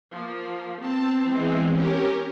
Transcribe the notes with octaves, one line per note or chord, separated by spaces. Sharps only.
F3 A#3
B3 C4 A5
E3 G#3
C#4 G4 A#4